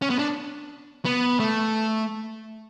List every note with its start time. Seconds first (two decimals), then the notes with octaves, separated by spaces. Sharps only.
0.02 C#4
0.10 B3
0.19 D4
1.05 B3
1.39 A3